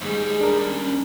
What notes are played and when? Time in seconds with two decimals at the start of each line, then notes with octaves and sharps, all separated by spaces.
0.01 D#2 G#2 G3 G#3
0.26 G#4
0.41 D4 A#4
0.68 C#4